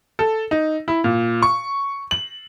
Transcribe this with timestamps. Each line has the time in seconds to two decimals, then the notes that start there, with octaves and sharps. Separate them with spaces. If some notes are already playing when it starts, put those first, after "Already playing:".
0.19 A4
0.51 D#4
0.88 E4
1.04 A#2
1.42 C#6
2.11 F#7